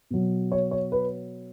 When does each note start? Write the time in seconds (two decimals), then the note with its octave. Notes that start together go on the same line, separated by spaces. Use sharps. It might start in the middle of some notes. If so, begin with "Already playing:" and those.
0.10 B2 F#3
0.52 C#5
0.71 C#5
0.92 B4